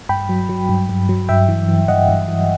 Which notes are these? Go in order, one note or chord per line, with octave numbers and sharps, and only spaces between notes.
G2 G5 B5
F#3
F#3
G2
G2
F#3
G2 E5 G5
E3
E3
G2 D#5 F#5
G2
E3